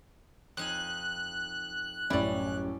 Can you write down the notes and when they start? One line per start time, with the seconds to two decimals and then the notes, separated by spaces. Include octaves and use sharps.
0.57 F2 D#4 G#5 F#6
2.10 A1 F#2 G3 C#4 E4 D5